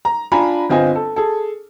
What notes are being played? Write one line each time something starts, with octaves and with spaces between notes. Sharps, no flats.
A#5
D4 F4 G#5 A#5 B5
G1 C4 F4 D#5 G#5
A4
G#4 A4